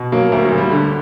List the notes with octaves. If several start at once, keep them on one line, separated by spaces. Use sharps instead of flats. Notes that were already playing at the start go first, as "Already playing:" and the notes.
Already playing: B2
F#3 A#3
D2 A#3
F#3
D2
G3
D3